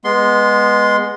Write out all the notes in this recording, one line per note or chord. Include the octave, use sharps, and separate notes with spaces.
G#3 B3 C6